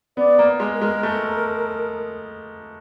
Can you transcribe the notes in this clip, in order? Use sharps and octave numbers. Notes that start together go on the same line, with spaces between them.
B3 D5
A#3
G#3
A#4
G#3
A3